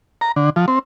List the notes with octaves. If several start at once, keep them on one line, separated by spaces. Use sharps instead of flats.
A#5
D3
F3
C4